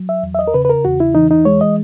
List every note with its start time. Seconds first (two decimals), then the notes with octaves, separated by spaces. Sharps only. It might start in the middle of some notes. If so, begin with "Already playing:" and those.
Already playing: F#3
0.09 E5
0.23 E2
0.35 E5
0.39 D#5
0.47 A#4
0.54 C#3 B4
0.65 B4
0.70 A#4
0.85 E2 F#4
1.00 E4
1.15 E3 D#4
1.31 D#4
1.45 G#3 C#5
1.61 D#5